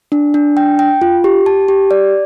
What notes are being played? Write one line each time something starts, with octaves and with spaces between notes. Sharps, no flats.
D4
D4
G5
G5
F4
G4
A5
G4
D5